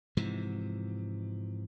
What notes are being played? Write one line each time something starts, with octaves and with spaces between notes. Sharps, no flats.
G#2 C3 E3 F3